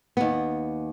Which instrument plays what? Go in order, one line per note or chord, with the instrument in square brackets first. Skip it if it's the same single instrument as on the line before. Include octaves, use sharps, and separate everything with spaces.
[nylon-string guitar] D#2 B3